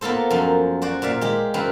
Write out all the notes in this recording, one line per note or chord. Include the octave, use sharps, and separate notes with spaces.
A#3 B3 F4 A4 C5
F#2 F3
F#4 C5 D5
A#2 D5 E5 F5
G#3 G4
F#2 C4 B4 F5